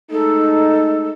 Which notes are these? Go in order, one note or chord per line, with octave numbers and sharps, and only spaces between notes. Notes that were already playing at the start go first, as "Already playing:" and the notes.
G#3 A3 D#4 A4